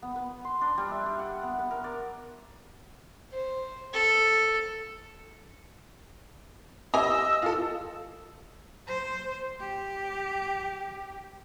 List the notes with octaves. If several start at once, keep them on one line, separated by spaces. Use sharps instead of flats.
B3
B4
C6
D4
G3
E5
G4
F#5
B3
B4
A#4
D5
C5
A4
G4 D#5 G#5 E6
F4 A4
C5
G4